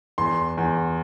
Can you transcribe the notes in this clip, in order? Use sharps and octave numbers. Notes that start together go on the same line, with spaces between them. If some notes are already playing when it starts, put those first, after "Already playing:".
E2 C6
E2